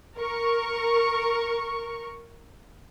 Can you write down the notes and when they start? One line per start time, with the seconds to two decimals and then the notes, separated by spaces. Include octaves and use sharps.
0.16 A#4 C#6